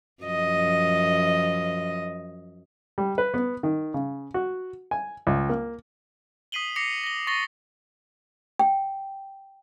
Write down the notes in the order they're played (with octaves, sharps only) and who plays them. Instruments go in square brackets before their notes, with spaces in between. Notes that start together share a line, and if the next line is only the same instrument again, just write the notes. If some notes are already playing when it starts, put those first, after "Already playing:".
[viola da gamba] F#2 F3 D#5
[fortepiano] G3
B4
B3
D#3
C#3
F#4
G#5
C#2
A#3
[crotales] D#6 B6 C7 D#7 F#7 G7
D6 A#6 C7 C#7 F7
A#6 G7
C#6 A6 A#6 C7 F#7 G7
[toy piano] G5